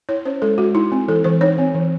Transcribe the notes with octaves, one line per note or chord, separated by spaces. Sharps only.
E4 C#5
C#4 C5
G#3 A4
G#3 F#4
D#4 E4
C4
E3 A4
E3 C5
D#4 C#5
C4
E3